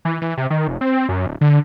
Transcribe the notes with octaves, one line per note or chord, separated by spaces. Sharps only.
E3
E3
C3
D#3
F1
C4
F#2
D1
D3